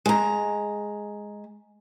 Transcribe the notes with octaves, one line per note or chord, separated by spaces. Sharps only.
G#3 A#5